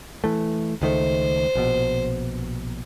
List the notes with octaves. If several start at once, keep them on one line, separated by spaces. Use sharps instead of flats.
E3 A3
C#2 D#3 A3 C5
A#1 B2